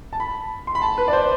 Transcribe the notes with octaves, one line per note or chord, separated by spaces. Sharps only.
A5
B5
C6
B5
A5
B4
D5
C5